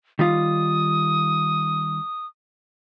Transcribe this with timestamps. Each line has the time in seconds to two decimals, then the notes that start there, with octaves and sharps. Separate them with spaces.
0.19 D#3 G3 F4 D#6